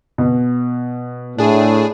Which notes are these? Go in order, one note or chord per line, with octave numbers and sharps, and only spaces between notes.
B2
A2 D4 G#4